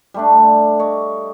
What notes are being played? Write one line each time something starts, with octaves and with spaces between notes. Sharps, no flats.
G3 A3 D4
C#5 D#5